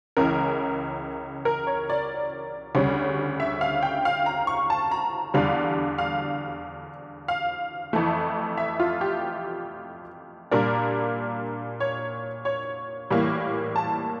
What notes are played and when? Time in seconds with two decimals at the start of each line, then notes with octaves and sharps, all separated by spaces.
0.17 C#2 C#3 E3 A#4
1.45 A#4
1.67 C#5
1.90 D5
2.75 D2 C#3 G3 C#4
3.40 E5
3.61 F5
3.83 G5
4.05 F5
4.26 A#5
4.47 C#6
4.70 A5
4.91 A#5
5.34 E2 D3 G3 D4 F5
5.98 F5
7.28 F5
7.93 F2 E3 A3
8.57 E5
8.80 F4
9.01 G4
10.51 A#2 G3 D4 A#4
11.80 C#5
12.45 C#5
13.10 A2 E3 G3 A#3
13.76 A5